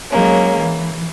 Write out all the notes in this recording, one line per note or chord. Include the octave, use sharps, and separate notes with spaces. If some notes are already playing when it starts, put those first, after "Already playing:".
F#3 G#3 A#3 C#4
E3